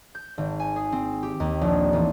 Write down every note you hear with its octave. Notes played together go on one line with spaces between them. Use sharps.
G6
G#1
G#5
G#4
C4
G4
D#2
A#1
A1